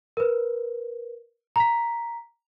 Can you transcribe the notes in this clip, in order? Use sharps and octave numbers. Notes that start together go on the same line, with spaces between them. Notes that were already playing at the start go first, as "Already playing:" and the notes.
A#4 B4
A#5 B6